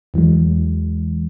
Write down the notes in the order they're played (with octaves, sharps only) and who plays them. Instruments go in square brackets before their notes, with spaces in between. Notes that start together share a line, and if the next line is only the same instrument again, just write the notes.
[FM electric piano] E2 E3 F#3 G#3